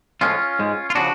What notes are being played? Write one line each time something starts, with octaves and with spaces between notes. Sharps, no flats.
A2 F3 G#3 C#4 F4
G#2 G#3
F4
C#3 F3 D4 F#4